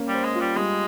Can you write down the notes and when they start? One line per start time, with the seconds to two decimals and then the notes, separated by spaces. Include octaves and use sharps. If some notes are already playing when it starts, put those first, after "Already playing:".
Already playing: A#3 C#4
0.08 G3
0.14 C5
0.24 G#3
0.35 F4
0.41 G3
0.56 G3 G#3